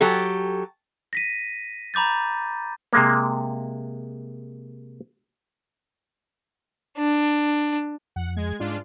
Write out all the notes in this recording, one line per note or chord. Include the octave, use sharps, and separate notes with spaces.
F#3 G4 A4
A#6 B6 D#7
A#5 B5 D6 G6 A6
C3 G#3 A#3
D4
F2 F#5
G#3 G#6
G#2 G#3 D4 F4